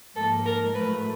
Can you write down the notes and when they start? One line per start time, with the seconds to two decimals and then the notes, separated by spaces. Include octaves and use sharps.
0.16 G#2 F3 A#3 A4
0.45 A#4
0.74 A2 F#3 A3 B4